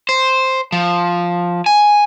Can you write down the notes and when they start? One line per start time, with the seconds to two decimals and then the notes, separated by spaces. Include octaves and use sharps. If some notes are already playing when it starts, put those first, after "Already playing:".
0.09 C5
0.72 F3
1.66 G#5